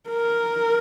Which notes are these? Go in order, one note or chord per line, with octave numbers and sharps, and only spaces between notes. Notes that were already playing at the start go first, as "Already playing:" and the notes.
A#4